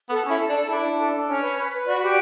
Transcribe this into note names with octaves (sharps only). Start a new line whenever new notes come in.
B3 A4
C#4
E4
A4
D4
A4
D4 E4
D4
A4
D4
C#4
B4
B4
B4
F#4 D5
G4